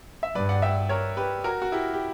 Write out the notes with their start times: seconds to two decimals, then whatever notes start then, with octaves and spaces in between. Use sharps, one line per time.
0.23 E5
0.35 G2 B4 D5
0.49 D5 F#5
0.62 E5 G5
0.89 A#4 C#5
1.17 G4 B4
1.44 F#4 A#4
1.62 F#4
1.72 E4 G4
1.93 G4